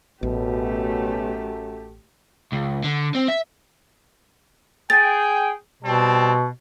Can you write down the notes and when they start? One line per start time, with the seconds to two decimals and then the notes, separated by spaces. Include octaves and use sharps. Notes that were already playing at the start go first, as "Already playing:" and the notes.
0.23 A1 F#2 B2 A3 G4 A4
2.53 C#2
2.85 D3
3.15 C4
3.28 E5
4.90 G#4 G5 A6
5.83 B2 G3 C4 A5